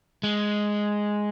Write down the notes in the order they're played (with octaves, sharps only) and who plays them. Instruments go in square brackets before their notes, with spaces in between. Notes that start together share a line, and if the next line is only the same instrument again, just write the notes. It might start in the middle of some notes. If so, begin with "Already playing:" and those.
[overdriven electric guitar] G#3